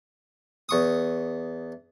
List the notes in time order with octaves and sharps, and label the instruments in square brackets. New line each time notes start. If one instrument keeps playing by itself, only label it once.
[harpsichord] E2 C#6 D#6